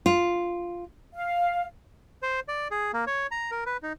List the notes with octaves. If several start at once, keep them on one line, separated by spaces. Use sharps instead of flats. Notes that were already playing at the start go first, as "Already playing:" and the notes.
F4
F5
C5
D5
G#4
A#3
C#5
A#5
A#4
B4
D#4